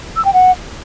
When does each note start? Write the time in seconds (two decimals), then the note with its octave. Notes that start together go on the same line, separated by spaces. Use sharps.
0.16 E6
0.25 G5
0.34 F#5